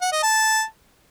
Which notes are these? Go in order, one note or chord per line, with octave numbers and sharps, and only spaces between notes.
F#5
D#5
A5